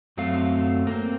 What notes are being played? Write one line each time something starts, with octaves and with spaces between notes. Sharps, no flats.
F#2 F#3 A3 C4 F5
A#3 C4